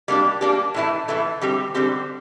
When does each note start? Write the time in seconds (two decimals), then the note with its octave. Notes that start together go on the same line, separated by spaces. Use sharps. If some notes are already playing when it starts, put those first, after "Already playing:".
0.08 G3 A#3 D4 G4
0.41 G3 A#3 D4 G4
0.74 A2 E3 A3 E4
1.08 A2 E3 A3 E4
1.41 D3 G3 C4 G4
1.74 D3 G3 C4 G4